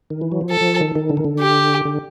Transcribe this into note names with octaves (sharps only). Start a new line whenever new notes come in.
D#3
E3
F#3
F3
A4
F3
D#3
D#3
D3
D#3
D3
G4
D3